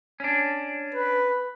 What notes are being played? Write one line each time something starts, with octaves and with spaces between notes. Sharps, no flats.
C#4 D4
B4